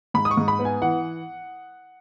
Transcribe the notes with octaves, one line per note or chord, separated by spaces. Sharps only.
G#2 B5
D#6
C#6
G#2
B5
B3
G#5
E3 F#5